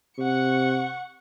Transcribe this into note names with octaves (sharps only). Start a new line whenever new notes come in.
C3 F#5 C#6